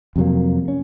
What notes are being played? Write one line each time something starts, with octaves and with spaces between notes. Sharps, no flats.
F2 C3 F#3 A#3
C#4